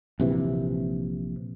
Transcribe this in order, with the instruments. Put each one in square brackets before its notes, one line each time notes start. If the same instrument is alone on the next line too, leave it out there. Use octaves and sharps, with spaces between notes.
[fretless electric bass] A#1 C3 E3